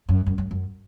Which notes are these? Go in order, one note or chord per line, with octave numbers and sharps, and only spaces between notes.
F#2
F#2
F#2
F#2